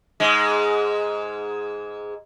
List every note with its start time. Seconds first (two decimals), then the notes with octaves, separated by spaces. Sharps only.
0.20 G#2 G#3